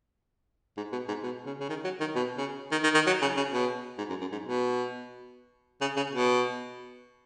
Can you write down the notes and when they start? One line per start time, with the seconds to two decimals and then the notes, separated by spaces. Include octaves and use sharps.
0.77 G#2
0.92 B2
1.08 G#2
1.23 B2
1.46 C#3
1.60 C#3
1.69 D#3
1.84 F#3
2.00 D#3
2.15 B2
2.38 C#3
2.72 D#3
2.84 D#3
2.95 D#3
3.07 F#3
3.22 C#3
3.37 C#3
3.52 B2
3.98 G#2
4.10 F#2
4.21 F#2
4.32 G#2
4.44 B2
5.81 C#3
5.97 C#3
6.12 B2